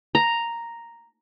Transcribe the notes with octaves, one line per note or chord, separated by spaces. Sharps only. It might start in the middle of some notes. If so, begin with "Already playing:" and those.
A#5